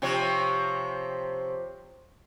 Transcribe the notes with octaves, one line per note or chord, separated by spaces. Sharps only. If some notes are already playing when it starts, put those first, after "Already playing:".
C3 F3 C#5